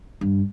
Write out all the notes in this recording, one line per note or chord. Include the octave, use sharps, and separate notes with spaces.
G2